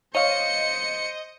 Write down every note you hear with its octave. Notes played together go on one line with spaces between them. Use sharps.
C5 C#5 D#5 F5 C#7